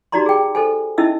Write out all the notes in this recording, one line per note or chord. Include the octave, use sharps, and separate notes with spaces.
D#4 F#4 G4 D5 A#5 C6
G#4 G5
A4 C5 G#5
C#4 D#4 E4 D#5 E5 E6